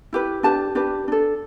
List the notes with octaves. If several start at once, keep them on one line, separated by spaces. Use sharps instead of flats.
E4 G4 B4
D4 G4 B4 A5
D4 G4 B4
D4 A4